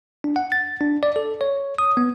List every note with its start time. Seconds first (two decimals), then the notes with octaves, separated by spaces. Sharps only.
0.24 D4
0.36 F#5
0.52 A6
0.81 D4
1.03 D5
1.16 A4
1.41 C#5
1.78 D#6
1.97 B3